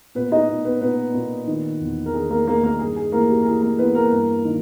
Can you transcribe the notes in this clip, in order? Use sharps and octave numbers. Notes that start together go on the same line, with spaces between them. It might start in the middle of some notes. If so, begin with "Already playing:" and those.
A#2 B3 B4
D#4 D#5
A#2
B3 B4
A#2 B3 B4
A#2
D#3
E2
A#4
D#3 G#4
A#3 A#4
D#3 A#3 A#4
A#3 A#4
G2 G#4
G#4
E3 A#3 A#4
G4
A#4
E3 G#4
A#3 A#4
E3 B3 B4
A#3 A#4
G2
D#3